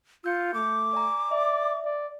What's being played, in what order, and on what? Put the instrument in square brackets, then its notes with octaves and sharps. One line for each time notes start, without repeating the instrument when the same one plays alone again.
[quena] F4 [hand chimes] E6 G6 C#7
[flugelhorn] A3 [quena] D6
[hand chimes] D5 G#5 A#5
[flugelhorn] D5 [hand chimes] E5
[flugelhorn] D5